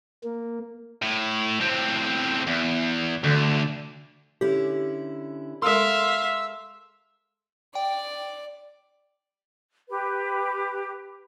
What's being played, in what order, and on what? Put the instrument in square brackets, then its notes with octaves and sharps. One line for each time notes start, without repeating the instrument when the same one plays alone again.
[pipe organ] A#3
[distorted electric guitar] A2
A2 C4
E2
[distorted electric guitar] D2 [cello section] D3
[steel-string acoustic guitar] D3 C#4 E4 [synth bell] G4
[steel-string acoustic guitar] G#3 A4 A#4 [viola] E5 F5 [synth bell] C6 [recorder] E6
[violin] D5 [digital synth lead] G5
[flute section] G4 B4